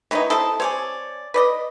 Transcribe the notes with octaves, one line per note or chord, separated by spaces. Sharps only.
D#3 E3 D#4 E4 B4 C#5
C4 E4 A4 A5 D#6
C4 C#5 D5 G#5
B4 D5 D#5